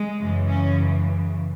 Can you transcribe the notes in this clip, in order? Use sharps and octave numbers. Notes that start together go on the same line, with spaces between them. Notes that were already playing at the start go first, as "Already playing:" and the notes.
Already playing: G#3
F#2 C#3 E3
C#4